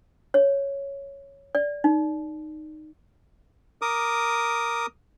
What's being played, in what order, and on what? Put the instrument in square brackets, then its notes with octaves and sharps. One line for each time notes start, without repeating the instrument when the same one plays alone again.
[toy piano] C#5
D5
D#4
[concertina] A#4 D6 D#6